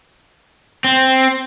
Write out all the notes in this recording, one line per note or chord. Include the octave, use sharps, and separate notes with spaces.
C4